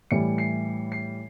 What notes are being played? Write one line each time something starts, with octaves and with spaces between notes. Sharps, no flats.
A2 E3 G3 C#7
C7
C7